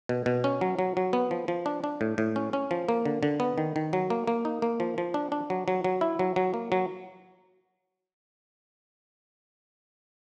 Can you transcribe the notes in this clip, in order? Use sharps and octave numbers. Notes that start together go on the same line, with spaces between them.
B2
B2
C#4
F#3
F#3
F#3
B3
F3
F3
D4
D4
A2
A2
C#4
C#4
F3
A#3
D3
D3
B3
D#3
D#3
F#3
A#3
A#3
D#4
A#3
F3
F3
D4
D4
F#3
F#3
F#3
E4
F#3
F#3
A#3
F#3